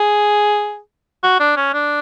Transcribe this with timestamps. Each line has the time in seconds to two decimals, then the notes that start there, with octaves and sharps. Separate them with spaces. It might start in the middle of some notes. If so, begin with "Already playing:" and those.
Already playing: G#4
1.23 F#4
1.40 D4
1.57 C#4
1.74 D4